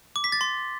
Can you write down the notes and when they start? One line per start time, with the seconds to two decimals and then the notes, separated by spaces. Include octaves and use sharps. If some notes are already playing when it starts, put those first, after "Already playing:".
0.16 D6
0.24 B6
0.32 A6
0.41 C6